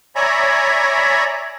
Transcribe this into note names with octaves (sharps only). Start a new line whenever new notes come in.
C#5 D5 E5 G#5 A#5 B5